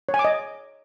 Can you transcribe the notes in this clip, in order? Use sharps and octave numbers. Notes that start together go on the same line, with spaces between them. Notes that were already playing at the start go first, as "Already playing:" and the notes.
C#5
G#5
D6
D#5